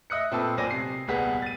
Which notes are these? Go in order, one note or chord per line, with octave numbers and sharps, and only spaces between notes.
D#5 E5 D#6 F#6 C#7
A#2 A3 C4 B4 A5 E6
B1 A#2 C5 D5 G#5 A#6
C3 C7
D#1 C2 B3 G#4 F#5 B6
A6 D#7